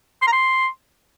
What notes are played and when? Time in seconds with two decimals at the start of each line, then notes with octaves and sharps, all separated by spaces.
0.22 C6
0.27 A#5
0.33 C6